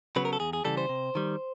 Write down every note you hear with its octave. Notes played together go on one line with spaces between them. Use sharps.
C#3 F#3 B3 B4
A#4
A4
E2 G#4
G#4
C#3 E3 G3 A4
C5
C3
D#3 G3